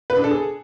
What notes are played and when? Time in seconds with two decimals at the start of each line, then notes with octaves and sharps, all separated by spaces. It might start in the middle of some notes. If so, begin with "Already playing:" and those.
0.10 B4
0.17 D4
0.24 A4
0.31 G#4